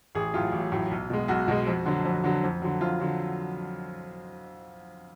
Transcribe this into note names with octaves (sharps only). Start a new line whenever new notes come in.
A1 G#4
A2 F#3 F4
A1
A2 F#3
B1
B2 G#3
B1 F#4
B2 G#3
F2
D3 F#3
F2
D3 F#3
F2
D3 F#3
F2 F4
D3 F#3